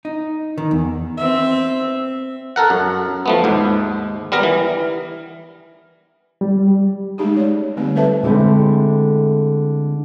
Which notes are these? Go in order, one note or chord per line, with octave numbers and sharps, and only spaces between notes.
D#4
D#3
E2
C4 E5
A4 A#4 F#5
F#2
F3 A3 B3
D#2 G#2
G3 B3 A#4 A#5
E3
G3
G#3 A3 C#4 D#4 G4 G#4
C#5 D5
D3 G3 A3 C4
G#4 A4 B4 C5 E5 A5
D3 G#3 A3 C4 E4